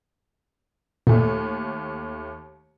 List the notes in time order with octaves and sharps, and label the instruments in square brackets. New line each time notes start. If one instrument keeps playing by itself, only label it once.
[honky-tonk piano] D#2 A3 [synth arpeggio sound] A#2